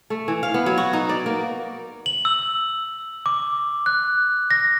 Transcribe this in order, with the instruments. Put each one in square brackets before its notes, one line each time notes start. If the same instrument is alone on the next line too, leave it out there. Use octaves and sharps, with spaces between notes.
[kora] A3
E3
F5
B3
F#3
F#4
D#4
D5
A#3
[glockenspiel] F#7
E6
D6
F#6
A#6